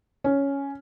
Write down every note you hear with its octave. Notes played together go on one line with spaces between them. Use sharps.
C#4